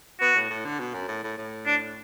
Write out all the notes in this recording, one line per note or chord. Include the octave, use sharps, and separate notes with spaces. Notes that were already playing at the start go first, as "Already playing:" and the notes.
B3 F#4
A2
A2
D3
B2
F#2
A2
A2
A2
D4